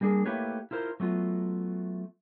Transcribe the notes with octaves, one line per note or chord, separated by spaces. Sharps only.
G3 A#3 D4 G#4
A3 A#3 E4 G4 B4 C#5
E4 F4 A#4 C5
F#3 A3 B3 F4